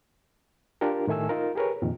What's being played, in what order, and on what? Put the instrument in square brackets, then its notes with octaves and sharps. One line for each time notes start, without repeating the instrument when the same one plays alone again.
[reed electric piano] D4 F4 G4 A#4
A2 D#3 A3 G#5 E6
D#4 F4 A#4
G4 G#4 A#4 B4 C#5
F2 A#2 D#3